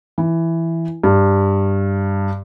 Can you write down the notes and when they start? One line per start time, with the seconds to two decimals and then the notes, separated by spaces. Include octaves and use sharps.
0.18 E3
1.04 G2